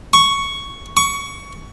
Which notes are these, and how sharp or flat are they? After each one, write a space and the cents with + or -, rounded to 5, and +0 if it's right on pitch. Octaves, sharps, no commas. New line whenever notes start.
C#6 +5
C#6 +20